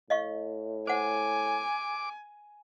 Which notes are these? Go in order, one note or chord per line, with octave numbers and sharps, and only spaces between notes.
A2 D#5 F5 C#6
C5 F#5 G#5 D6